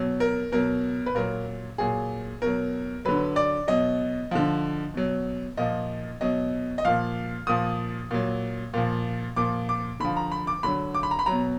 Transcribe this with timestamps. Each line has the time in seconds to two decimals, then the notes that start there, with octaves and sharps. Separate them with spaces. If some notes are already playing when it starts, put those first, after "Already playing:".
Already playing: B2 F#3
0.20 A#4
0.52 B2 F#3 A#4
1.06 B4
1.15 A#2 F#3 A#4
1.78 A#2 F#3 G#4
2.42 B2 F#3 A#4
3.05 D3 F#3 B4
3.36 D5
3.68 B2 F#3 D#5
4.31 D3 F3
4.94 B2 F#3
5.57 A#2 F3 D#5
6.21 B2 F#3 D#5
6.78 D#5
6.85 A#2 F3 F5
7.47 A#2 F3 D#6
8.11 A#2 F#3
8.74 A#2 F3
9.36 A#2 F3 D6
9.69 D6
10.00 D3 F3 B5
10.17 A#5
10.32 B5
10.47 D6
10.63 D3 F#3 B5
10.94 D6
11.03 B5
11.11 A#5
11.19 B5
11.26 B2 F#3 A#5